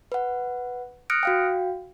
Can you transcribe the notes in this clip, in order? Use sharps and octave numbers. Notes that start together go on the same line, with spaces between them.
B4 F#5
D#6 F6 F#6 A#6 C#7 D7
F#4 F5 G5